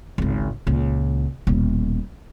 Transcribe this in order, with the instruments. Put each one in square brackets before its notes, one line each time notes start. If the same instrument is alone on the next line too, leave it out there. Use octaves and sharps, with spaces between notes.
[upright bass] G#1 C#2
C#2 A#2
D#1 B2